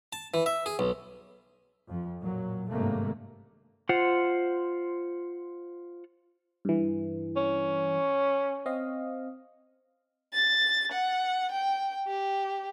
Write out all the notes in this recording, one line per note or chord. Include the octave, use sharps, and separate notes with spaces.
A5
E3
E5
G#4
B1
F2 F3
A1 A#2 F#3
G#1 G2 C3 A3 A#3
F4 C5 F#5
G2 E3
C#4
C4 D#5 F5
A6
F#5
G5
G4